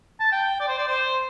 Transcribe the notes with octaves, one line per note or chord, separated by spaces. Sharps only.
A5
G5
D5
C5
D5
C5